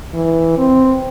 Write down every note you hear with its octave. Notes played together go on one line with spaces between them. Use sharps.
E3
C4